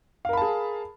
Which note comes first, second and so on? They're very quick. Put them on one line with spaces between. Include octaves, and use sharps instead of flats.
F5 A#4 B5 A5 G#4